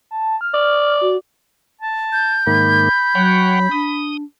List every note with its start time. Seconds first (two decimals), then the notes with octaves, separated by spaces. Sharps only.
0.11 A5
0.41 F6
0.54 D5
1.01 F#4
1.81 A5
2.12 G6
2.47 G#2 D#3 A#3 B5
3.15 F#3 C#5 F#5 G5
3.71 D4 D#6